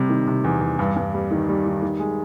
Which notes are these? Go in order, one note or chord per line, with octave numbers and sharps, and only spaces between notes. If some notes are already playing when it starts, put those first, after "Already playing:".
Already playing: C3 G3
D#3
C3
E2
E2
G2
G2
G3
D#3
G3
D#3
D#3
G#3